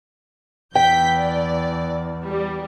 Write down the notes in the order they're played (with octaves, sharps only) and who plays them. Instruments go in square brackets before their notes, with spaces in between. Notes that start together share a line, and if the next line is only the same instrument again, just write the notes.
[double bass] E2 [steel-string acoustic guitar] G5 [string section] G6 B6
[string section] D5
G3